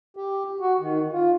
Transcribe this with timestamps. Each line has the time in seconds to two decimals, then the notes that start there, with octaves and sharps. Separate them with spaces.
0.17 G4
0.60 F#4
0.80 D#3
1.12 F4